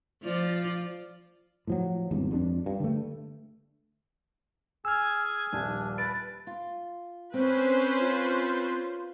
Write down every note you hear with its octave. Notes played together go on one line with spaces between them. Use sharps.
F3 F4 D5
A2 F3 F#3
G#1 E2 G2
F2 C#3 D4
G2
D3 A3
G#4 G#5 E6 F6
D#1 A#1 D4
B4 A6 D7
F4
C4 C#4 B4 C5
F4